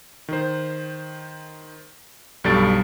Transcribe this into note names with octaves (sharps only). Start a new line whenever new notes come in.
D#3 C5
B1 G2 G3 A4 A6 D7